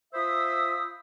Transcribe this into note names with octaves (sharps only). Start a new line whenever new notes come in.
F4 C5 E5 B5 D#6 E6